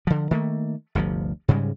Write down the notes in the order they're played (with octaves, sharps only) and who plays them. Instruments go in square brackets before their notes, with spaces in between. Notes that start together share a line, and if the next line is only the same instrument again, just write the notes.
[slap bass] D3 F3
D#3 A3 A#3
G1 D2 C3 F3
G#2 C#3 G3 G#3